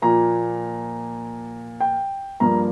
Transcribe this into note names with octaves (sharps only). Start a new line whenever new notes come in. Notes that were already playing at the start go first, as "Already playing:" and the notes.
A#2 F3 A#3 A#5
G5
G2 F3 A#3 A#5